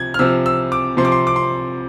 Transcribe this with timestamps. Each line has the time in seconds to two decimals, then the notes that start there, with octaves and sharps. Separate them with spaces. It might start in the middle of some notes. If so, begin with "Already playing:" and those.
Already playing: C3 F3 G#6
0.14 F6
0.19 C3 F3 E6
0.46 E6
0.72 D6
0.97 C3 F3 C6
1.05 D6
1.12 C6
1.27 D6
1.36 C6